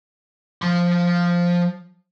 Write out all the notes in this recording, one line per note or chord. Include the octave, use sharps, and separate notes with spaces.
F3 C6